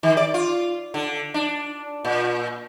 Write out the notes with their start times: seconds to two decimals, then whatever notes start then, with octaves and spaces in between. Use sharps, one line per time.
0.03 D#3
0.17 D5
0.34 F4
0.94 D3
1.34 D4
2.05 A#2